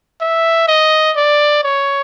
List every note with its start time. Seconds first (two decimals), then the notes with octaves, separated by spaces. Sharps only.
0.21 E5
0.68 D#5
1.16 D5
1.64 C#5